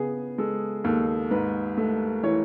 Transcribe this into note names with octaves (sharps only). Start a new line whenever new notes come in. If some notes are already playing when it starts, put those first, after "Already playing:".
Already playing: C#3 B3 G#4
G#3 A4
D#2 A4
G#2 B4
A3
E3 C#5